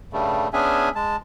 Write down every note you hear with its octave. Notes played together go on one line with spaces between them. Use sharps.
G2 C#3 G3 A3
B3 C#4 D4 G#4 E5 G#5
G#3 A5